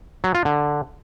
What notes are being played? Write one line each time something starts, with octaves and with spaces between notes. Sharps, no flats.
F#3
F4
D3